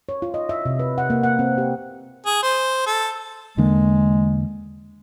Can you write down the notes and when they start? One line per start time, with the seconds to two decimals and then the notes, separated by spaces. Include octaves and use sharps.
0.09 C#5
0.22 F4
0.34 D#5
0.49 E5
0.65 C3
0.79 B4
0.98 F#5
1.10 A#3
1.23 F#5
1.39 C4
1.58 G4
2.26 G#4
2.43 C5
2.86 A4
3.57 E2 D3 G#3 A#3